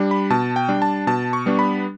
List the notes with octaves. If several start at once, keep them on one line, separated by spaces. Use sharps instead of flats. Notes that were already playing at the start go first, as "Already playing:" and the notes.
Already playing: G3 D4
B5
B2 A5
G5
G3 D4
A5
B2 A5
C#6
G3 B3 D4
B5